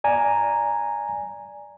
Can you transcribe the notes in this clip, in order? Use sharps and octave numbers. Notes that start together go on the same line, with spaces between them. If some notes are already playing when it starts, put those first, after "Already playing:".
D5 G#5 A#5